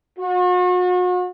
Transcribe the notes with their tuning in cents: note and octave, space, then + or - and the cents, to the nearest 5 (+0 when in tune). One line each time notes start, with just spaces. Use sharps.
F#4 -40